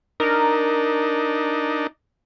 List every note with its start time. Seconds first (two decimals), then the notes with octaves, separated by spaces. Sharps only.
0.20 D4 D#4 A#4